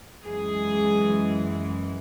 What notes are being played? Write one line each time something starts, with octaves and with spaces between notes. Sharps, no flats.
F#2 E3 G#3 G#4